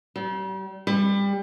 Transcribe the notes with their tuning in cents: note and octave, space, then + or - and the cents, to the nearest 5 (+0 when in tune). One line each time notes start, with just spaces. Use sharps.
G3 -35
G3 +25